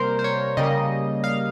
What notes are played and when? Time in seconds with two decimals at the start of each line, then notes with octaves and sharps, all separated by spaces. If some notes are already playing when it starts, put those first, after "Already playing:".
Already playing: C3 G3 A#3 A#4 C5
0.19 C5
0.24 C#5
0.57 C#3 G3 A#3 D#5
1.24 F5